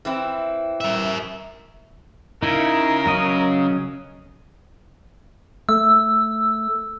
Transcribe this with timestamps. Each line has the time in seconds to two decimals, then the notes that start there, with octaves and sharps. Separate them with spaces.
0.05 E3 C4 E4
0.81 A#4 E5
2.43 C#3 D#4 E4 A#4
3.06 F#3 C#4 D#5
5.69 A3 E6